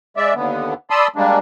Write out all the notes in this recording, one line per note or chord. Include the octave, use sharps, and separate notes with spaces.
G#3 D5 E5
D#2 D3 B3
D5 A5 B5 C6 D#6 E6
G3 G#3 A#3 D4